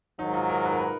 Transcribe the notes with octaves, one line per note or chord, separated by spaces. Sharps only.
G#2 D#3 F#3 D#4
F4
A#4
B4
A#4
B4